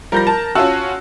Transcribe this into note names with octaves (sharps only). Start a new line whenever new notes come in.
F3 G3 A#4 G6 A#6
A#4 A5
C#4 F4 F#4 A5 E6 F#6